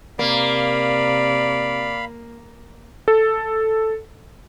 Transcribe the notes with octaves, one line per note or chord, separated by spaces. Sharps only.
C3 A#3 D5 F5 B5
A4